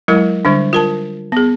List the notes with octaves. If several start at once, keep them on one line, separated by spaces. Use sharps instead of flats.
F#3 G#3 E4 A#4
D3 G3 D4
F4 A#4 A5
B3 G#4